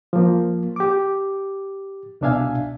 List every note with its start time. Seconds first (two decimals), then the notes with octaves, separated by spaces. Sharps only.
0.13 F3 A#3
0.76 G4 D6
2.21 C2 B2 D4 E5 F5 G#5